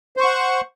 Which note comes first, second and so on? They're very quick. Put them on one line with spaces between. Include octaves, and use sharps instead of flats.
C5 C#6 F#5